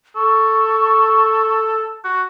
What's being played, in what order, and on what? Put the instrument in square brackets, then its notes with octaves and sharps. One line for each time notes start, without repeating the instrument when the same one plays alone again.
[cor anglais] A4 [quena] C#6
[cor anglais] F#4